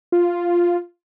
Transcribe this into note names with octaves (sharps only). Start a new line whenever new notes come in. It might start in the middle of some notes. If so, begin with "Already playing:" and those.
F4